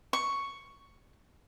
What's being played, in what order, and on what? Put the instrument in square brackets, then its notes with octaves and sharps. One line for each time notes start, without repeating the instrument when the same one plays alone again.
[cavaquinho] C#6